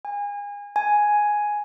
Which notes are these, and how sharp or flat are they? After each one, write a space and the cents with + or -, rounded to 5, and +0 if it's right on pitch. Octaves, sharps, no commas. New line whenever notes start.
G#5 -30
G#5 +5